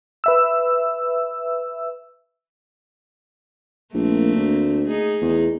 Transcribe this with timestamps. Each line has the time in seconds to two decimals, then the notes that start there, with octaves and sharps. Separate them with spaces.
0.24 B4 E5 E6
3.94 A#1 A3 A#3 C4
4.35 D2
4.84 D#4 G#4
5.22 E2